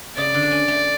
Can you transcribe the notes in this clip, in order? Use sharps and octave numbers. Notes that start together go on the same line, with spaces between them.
C#3 D5
D3
D4
C#4
A3